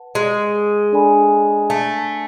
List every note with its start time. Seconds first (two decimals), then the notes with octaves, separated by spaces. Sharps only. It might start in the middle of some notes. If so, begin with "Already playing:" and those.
Already playing: B4 F#5 A5
0.15 G#3
0.92 D4 A4 D5 G#5 B5
1.70 A3